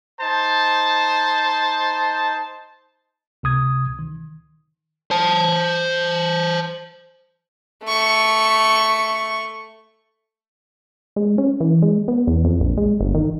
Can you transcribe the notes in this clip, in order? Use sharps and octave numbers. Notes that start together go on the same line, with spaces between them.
D#4 C5 A5
C#2 C3 D#6 G#6
D#3
C5 A5
A3 C#6
G#3
C#4
E3
G#3
B3
E2
F2
A#1
G#3
G1
D#3